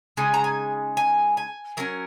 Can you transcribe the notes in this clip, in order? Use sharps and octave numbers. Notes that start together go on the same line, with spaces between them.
C#3 G#3 D#4 G#5
A#5
G#5
G#5
G#5
F#3 C#4 A#4